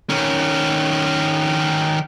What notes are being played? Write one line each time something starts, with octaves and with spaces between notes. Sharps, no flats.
D#3 C#4